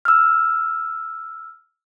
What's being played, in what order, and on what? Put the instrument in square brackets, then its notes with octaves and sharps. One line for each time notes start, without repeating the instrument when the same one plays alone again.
[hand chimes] E6 F6